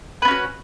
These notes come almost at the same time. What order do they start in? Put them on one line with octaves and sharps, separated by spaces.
B4 B3 C#4 F#4